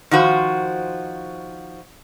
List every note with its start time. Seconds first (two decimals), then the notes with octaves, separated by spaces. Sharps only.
0.11 D#3 F3 F#4 C5